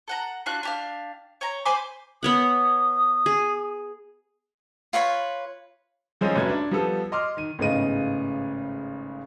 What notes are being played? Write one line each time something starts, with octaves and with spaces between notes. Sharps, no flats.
A4 F#5 A#5
D4 F4 F#4 F#6
D4 G4 F5
C#5 G5 A#5
C5 G#5 B5 D6
B3 C#5 F#5 D#6
G#4
F4 B4 C#5 B5
D#3 F3 G#3 C4 C#4 D#4
F1 F#3 A3 B4 G#6
D4
F3 G3 B3 A4
D#5 C6 D6 F6
D#3 D#7
G#1 A2 C#3 B3 D#5 D#7